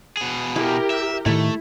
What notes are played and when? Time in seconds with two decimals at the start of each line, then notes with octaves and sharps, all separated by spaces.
0.17 B2 G#4
0.56 E4 G4 A#4
0.90 E5
1.26 A2 D#3 A3 E4